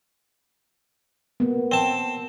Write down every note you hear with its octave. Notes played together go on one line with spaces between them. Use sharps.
A#3 B3
C4 A5